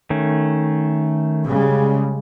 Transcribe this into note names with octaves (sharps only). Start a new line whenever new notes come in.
D#3 A3 C#4
C#3 G3 G#3